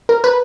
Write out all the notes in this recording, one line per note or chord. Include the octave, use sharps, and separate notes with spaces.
A#4
B4